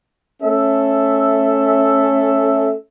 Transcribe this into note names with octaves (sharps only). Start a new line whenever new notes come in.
A3 C#4 A4 E5